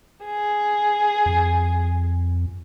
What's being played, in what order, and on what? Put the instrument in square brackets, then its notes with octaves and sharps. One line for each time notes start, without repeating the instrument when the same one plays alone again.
[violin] G#4
[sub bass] F2